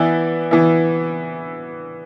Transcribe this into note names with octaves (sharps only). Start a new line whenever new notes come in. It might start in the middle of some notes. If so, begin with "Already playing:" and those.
Already playing: E3 B3 E4 D5
E3 B3 E4